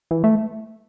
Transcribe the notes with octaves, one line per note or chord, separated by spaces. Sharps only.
E3
A3